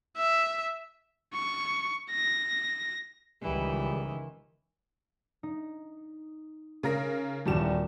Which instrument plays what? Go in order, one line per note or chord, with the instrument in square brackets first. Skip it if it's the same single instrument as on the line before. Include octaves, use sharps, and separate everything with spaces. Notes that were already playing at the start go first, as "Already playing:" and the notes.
[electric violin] E5
C#6
A#6
[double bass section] C#2 D#3 [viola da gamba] E3 [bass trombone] G3
[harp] D#4
[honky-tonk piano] C#3 A#4 A#6
[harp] D#1 G3 A5 [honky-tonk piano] E2 F#4 E7